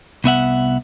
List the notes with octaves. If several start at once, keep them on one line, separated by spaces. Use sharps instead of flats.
C2 B3 E5 F#5